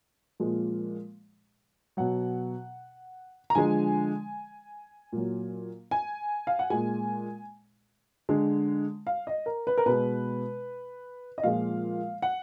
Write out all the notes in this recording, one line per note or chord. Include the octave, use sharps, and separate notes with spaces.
A#2 F3 G#3
B2 F#3 F#5
A#5
D3 F3 G#3 G#5
A#2 F#3
G#5
F5
F#5
A#2 G#3 G#5
D3 G#3
F5
D#5
A#4
B4
A#4
B2 G#3 B4
D#5
A#2 F3 G#3 F5
F#5